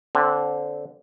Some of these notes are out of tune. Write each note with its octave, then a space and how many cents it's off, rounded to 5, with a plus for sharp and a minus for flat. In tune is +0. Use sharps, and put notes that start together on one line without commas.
D3 -15 C4 +0